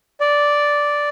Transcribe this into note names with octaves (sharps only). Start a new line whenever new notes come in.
D5